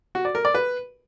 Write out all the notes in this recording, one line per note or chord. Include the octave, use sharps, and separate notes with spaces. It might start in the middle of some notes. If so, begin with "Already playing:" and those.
F#4
D5
A#4
D5
B4